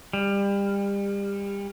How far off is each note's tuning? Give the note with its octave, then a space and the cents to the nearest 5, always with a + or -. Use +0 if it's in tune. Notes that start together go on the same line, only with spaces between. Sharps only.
G3 +30